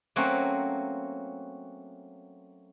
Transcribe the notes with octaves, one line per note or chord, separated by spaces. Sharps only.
F#3 A3 A#3 C4 C#4 F#4